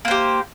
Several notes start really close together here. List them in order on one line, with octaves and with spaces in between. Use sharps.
A#3 C5 G4